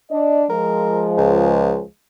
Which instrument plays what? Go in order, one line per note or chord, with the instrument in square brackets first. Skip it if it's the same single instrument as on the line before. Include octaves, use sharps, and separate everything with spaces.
[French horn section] D4 D5 D#5
[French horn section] F3 G#3 [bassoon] A#4
[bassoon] C#2